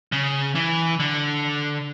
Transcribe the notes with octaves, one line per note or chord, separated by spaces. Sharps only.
C#3
E3
D3